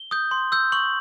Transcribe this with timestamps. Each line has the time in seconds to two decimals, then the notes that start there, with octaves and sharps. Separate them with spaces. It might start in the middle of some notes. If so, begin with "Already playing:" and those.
Already playing: G7
0.11 D#6 G6
0.31 C6
0.52 E6 G6
0.72 C#6 F#7